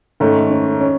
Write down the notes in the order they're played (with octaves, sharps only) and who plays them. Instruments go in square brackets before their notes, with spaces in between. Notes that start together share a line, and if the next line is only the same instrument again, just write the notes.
[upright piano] G#2 D#3 A3 [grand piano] C#4
[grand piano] C#4
C#4